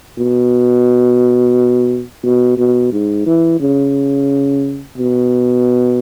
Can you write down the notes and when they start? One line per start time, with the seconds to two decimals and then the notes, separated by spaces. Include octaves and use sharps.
0.18 B2
2.23 B2
2.58 B2
2.92 G#2
3.26 E3
3.60 C#3
4.97 B2